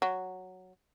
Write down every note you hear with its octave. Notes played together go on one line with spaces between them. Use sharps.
F#3